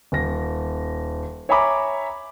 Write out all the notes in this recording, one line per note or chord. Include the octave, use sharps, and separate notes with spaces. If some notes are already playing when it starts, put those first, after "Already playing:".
D#1 A#6
C#5 E5 G#5 A#5 B5 D6